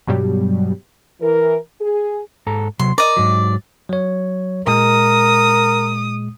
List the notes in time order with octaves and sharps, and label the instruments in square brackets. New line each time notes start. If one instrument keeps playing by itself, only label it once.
[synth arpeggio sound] G2 B2 F#3 G3
[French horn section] E3 A#4
G#4
[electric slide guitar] G#2 A4 A#5
[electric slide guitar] C3 F#3 [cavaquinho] C6
[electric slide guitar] A#4 [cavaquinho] D5 D#5
[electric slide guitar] G#2 F#3
[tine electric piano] F#3 C#5
[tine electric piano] A#2 G#3 [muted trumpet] A#4 [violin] D#6